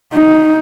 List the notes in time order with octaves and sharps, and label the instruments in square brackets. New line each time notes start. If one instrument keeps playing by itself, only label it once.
[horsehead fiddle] D#4